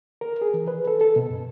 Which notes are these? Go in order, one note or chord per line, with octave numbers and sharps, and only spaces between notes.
A#4
G#4
E3
B4
A4
A4
B2
F#2